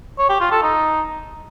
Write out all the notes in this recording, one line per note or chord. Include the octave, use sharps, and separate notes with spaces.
C#5
G4
F4
A4
D#4